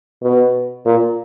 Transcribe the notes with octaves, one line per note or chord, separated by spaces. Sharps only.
B2
A#2